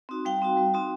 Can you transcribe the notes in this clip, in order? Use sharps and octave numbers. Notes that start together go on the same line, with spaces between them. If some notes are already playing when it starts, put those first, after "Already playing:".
C4 D#4 F#4
G3 F5 G5
C4 D#4 F#4
G3
C4 D#4 F#4